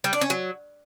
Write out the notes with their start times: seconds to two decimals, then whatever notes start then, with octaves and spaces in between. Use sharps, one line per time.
0.04 G3
0.13 D4
0.21 C#4
0.30 F#3